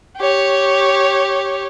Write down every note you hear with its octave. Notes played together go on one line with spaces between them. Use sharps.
G4 C#5